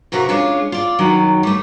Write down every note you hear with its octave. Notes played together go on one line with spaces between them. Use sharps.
F2 C3 F#4 A#4 B4
G#3 C#4 D4 F4
F4 D5
F#2 D#3 F#3
G3 A3